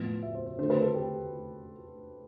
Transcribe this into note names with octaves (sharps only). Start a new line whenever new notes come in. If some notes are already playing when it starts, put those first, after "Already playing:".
Already playing: A2 F3 B3
E5
C5
C5
D3 A3 C5
B4
A4
G4